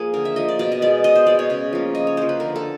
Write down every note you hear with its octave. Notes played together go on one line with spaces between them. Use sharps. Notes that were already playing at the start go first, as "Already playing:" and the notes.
Already playing: F3 A#3 G#4
D3 A#4
E5
F3 A#3 D#5
D5
B2 D5
D#5
G#3 B3 D5
B2 D#5
C5
G#3 B3 D5
C#5
C#3
F3 A#3
C#3 D#5
C#5
F3 A#3 C5
B4
D3 A#4
A4